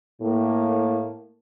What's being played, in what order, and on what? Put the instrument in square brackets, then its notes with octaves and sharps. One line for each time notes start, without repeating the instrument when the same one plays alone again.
[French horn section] A2 A#3